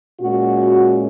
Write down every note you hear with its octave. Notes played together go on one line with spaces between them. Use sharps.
A#2 G#3 C#4 F#4